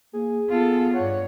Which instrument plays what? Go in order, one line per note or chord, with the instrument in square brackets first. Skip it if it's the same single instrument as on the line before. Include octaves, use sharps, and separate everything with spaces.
[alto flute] A#3 [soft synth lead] G#4
[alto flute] B3 [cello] F4 A4
[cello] G2 C#5 [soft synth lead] F#5